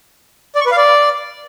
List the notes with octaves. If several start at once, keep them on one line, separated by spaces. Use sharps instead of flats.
D5
C#6
B4
F5
D5